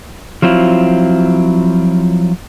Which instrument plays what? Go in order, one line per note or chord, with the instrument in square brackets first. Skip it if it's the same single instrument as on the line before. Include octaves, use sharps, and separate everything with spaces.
[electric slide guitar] F3 F#3 C4 E4 F4